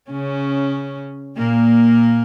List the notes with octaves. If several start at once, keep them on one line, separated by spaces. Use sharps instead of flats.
C#3 C#4
A#2 A#3